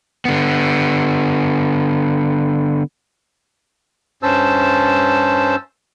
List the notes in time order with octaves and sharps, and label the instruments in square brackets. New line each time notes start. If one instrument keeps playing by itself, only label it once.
[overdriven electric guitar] D3 B3
[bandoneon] G2 C#4 C5 A5 E6